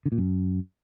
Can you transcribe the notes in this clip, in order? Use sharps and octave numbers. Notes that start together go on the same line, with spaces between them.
D3
A#2
F#2